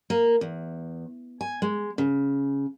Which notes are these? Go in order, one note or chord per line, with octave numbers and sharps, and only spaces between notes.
A#3
E2
G#5
G#3
C#3